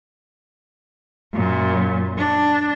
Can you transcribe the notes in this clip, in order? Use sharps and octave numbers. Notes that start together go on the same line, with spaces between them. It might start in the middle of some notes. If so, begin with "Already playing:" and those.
F#2 A#2
D4